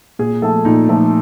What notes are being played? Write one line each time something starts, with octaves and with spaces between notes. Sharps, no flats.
A#2 G#4
F3 A3 A4
A#2 D#4
F3 A3